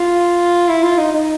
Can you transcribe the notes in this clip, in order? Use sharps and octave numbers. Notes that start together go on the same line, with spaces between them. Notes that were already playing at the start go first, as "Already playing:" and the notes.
Already playing: F4
E4
F4
D#4
D#4